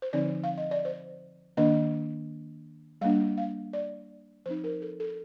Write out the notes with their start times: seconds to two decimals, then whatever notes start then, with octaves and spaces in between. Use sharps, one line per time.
0.02 C5
0.13 D3 F3 C4 D#4 D5
0.44 F5
0.58 D#5
0.71 D5
0.85 C5
1.57 D#3 A#3 D4 D#5
3.01 G3 A#3 D4 F5
3.38 F5
3.73 D5
4.46 F3 C4 D#4 C5
4.64 A#4
4.82 A4
5.00 A4